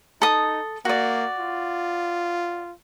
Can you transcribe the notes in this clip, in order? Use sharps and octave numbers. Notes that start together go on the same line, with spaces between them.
D#4 A4 D#6
A#3 F#4 D5
F4